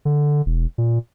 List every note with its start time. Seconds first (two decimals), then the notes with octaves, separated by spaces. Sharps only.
0.05 D3
0.46 E1
0.78 A#2